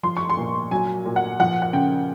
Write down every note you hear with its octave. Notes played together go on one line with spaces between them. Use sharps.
F3 C6
C#6
C6
A#2
F#3 G#5
A#2
F#5
F3 F#5
F#5
C#3 G5